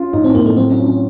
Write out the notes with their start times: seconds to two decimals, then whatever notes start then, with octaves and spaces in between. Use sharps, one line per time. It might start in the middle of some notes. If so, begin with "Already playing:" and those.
Already playing: C#4 F4
0.13 A2 D#4
0.24 C4
0.35 A2 A#3
0.46 A3
0.57 F#3 C4
0.71 C#4
0.79 F4
0.86 C#4